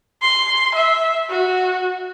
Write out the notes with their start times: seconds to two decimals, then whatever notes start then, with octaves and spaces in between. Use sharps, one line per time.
0.22 C6
0.74 E5
1.30 F#4